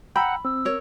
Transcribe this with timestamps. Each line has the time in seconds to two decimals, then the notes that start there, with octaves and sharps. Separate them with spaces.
0.16 F#5 G5 A#5 B5 E6
0.45 C4 E6
0.65 A#4 C#5